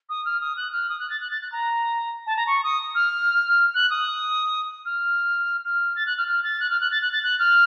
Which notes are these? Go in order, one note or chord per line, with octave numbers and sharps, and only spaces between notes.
D#6
F6
D#6
F#6
F6
D#6
F#6
A6
F#6
A6
F#6
A#5
A5
A#5
C#6
D#6
F6
F#6
D#6
F6
F6
A6
F#6
F6
F6
A6
F#6
F6
F#6
A6
F#6
A6
F#6
F6